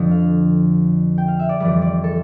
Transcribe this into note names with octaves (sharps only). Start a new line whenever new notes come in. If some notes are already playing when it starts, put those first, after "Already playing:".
Already playing: F2 D3 F3
F5
G5
F5
E5
D5
F2 E3 G3 D5
D5
A4